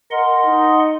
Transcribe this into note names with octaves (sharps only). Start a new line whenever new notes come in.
A#4 D#5 F#5 C6
D#4